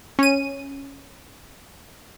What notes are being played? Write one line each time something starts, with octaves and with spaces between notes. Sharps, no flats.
C#4 D#7